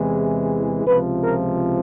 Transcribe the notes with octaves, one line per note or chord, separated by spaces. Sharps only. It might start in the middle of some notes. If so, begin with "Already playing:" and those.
Already playing: E2 C3 E3 G#3
C#2 C3 F3 B4
A#4